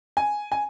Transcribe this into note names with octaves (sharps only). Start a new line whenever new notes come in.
G#5
G#5